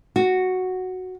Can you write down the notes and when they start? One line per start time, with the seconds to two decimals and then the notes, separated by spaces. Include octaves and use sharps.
0.16 F#4